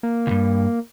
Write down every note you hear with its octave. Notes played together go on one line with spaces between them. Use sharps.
A#3
C#2 G2